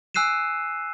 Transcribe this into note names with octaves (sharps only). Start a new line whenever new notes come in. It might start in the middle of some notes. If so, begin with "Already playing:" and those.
G#5 E6 F#6 C7 D#7 E7